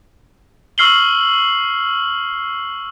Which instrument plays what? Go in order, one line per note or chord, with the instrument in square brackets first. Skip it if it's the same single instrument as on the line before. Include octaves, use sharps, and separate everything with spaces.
[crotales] C#6 E6 F6 C7 F#7 G7